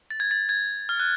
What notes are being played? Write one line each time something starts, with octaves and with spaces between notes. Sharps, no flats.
A6
G#6
A6
G#6
F6
F#6